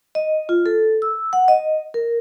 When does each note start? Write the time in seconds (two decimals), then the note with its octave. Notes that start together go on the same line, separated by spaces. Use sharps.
0.15 D#5
0.49 F4
0.66 A4
1.02 E6
1.33 F#5
1.48 D#5
1.94 A#4